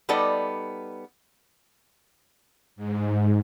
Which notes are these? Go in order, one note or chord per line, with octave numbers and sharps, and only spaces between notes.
G3 B3 D#4 A4 D5
G#2